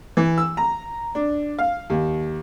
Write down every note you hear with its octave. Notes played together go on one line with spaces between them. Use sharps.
E3
E6
A#5
D4
F5
D#2